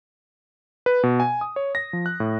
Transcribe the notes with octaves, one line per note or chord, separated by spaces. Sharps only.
B4
B2
G#5
D#6
C#5
A#6
F3
F#6
A2